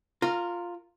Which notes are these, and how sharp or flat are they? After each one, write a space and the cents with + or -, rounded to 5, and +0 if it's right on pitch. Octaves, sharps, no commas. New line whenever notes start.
F4 +5 A#4 -15